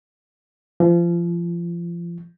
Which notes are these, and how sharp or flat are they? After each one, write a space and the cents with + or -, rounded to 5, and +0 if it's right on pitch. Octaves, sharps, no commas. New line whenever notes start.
F3 -30